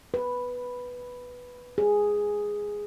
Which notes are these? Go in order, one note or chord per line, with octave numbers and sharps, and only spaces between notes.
B4
G#4